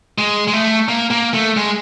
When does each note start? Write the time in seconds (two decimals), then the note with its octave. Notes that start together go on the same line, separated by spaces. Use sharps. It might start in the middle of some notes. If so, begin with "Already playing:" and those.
0.18 G#3
0.48 G#3
0.54 A3
0.89 A#3
1.11 A#3
1.34 A3
1.57 G#3